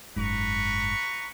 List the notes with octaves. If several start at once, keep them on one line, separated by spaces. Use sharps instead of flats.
F#1 G#2 B4 A#5 C#6